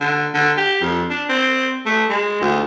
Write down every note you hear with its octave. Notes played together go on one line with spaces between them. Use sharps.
D3
D3
G4
F2
D4
C4
A3
G#3
D2